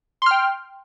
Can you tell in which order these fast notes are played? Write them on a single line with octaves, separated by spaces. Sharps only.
C6 F6 G5